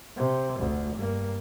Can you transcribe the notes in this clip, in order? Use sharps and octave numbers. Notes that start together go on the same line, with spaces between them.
C3
F1 D2
G2 A#3